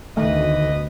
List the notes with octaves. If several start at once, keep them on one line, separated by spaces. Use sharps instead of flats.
D2 B2 D#3 E3 A3 B4 D#5